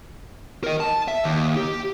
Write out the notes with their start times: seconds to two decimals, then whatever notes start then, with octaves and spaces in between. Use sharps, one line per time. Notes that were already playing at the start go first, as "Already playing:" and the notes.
0.64 A#4 D#5
0.80 A5
1.08 E5
1.24 D#2
1.56 G4